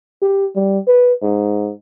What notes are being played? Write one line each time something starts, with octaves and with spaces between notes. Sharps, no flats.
G4
G3
B4
G#2